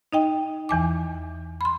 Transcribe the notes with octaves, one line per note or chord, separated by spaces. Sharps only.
D#4 D#5 G5
E2 E3 G#5 D6
B5 C6